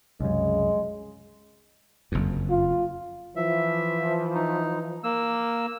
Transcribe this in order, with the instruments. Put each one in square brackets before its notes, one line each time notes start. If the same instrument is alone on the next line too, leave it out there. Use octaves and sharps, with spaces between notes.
[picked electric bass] C2 F#2 [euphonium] C#3 [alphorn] G#3
[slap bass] F#1 F2
[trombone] F4
[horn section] E3 F3 [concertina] E5
[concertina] D#4
A#3 E6